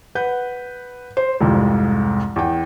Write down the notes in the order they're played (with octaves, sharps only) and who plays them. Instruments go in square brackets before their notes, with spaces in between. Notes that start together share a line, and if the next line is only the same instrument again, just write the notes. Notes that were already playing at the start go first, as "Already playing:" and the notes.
[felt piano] B4 F#5 G6
C5
C2 F2 G#2 C3
E2 G5